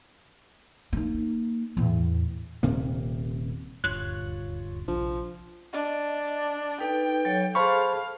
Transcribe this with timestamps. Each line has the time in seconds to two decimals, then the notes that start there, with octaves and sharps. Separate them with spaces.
0.93 A#3 D#4
1.77 E2 A2
2.63 D#1 C3 A#3
3.84 D#1 D2 G2 F4 C#5 F#6
4.88 A#1 C3 F3 D4
5.73 D4 D#5
6.80 D#4 A4 B4 G5
7.25 F#3 A4 C#5
7.55 G#4 A4 C5 F5 A5 B5 C#6